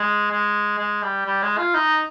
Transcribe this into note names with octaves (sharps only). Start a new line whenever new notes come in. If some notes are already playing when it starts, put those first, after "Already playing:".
Already playing: G#3
G#3
G#3
G3
G3
G#3
F4
D#4